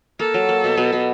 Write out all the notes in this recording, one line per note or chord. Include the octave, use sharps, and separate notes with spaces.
A#3 A4
F#3
A#3
B2
B2
B2